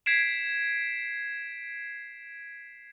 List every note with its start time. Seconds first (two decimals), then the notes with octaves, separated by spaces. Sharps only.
0.06 G#6 B6 C7 D7 E7